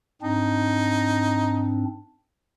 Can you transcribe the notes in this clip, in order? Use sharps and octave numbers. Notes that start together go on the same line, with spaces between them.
G#2 C4 D4 D#4